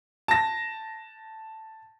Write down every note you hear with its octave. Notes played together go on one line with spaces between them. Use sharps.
A5 A#6